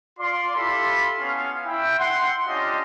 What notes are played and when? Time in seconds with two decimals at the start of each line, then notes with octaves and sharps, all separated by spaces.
0.19 F4 D5 C6
0.56 E4 F4 G4 A4 B5 C6
1.20 B3 C#4 F5
1.66 E4 G5
1.99 F#5 C6
2.46 C#4 D4 F4 G4 D5 D#5